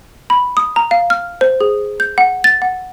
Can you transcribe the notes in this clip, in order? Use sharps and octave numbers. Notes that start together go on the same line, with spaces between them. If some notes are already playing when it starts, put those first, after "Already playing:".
B5
D#6
A#5
F5
F6
C5
G#4
G6
F#5
A6
F#5